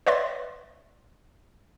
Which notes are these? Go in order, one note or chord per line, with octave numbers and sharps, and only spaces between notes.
B4 C#5 D5 E5 C6 A6